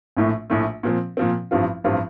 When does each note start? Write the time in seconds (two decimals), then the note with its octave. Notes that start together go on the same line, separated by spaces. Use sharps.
0.17 A#1 A2 A3
0.50 A#1 A2 A3
0.83 A#2 F3 C4
1.17 A#2 F3 C4
1.51 A1 G2 F3 C4 F4
1.84 A1 G2 F3 C4 F4